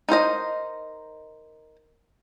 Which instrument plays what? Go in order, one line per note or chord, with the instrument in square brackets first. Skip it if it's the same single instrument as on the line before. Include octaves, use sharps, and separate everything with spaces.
[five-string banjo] D#4 A#4 C5 D#5